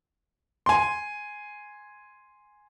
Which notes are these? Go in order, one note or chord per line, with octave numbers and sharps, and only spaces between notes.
G#5 C6